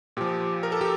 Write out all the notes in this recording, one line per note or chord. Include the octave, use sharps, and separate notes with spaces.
A#2 F3 G4
A#4
A4
G4